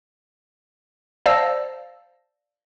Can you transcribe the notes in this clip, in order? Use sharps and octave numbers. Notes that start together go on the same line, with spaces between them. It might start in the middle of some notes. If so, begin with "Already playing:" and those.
C5 D5 F5 A5 E6 A#6